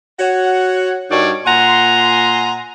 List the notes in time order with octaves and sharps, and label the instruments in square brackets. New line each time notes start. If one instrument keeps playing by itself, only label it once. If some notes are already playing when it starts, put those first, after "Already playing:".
[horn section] F#4 C#5 F#5
G2 D#4 F#4 A#4 C#5 D5
A#2 F#5 G#5 A#5 C6